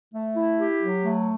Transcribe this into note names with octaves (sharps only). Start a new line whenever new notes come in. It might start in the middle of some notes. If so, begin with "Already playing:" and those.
A3
E4
G4
F#3
A3